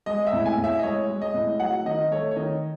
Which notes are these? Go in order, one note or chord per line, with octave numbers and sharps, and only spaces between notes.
G#3 D#5
E5
A2
G#5
A2
E5
D#5
G#3 C#5
G#3
D#5
A2
F#3 F#5
D#3 D#5
A3 C#5
C#5
D#3 D#5